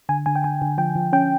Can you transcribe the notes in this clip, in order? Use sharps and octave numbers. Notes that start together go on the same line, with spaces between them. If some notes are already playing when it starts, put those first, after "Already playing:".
D3 G#5
D3 G#5
G5
D3 G#5
D3
F3 G5
F3
C#4 G5